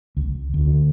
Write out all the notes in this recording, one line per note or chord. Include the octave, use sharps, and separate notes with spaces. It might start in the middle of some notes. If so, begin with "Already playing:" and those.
C#2
D2